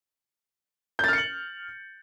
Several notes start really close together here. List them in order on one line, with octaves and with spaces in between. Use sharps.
G6 A6 F6 C#7 F#7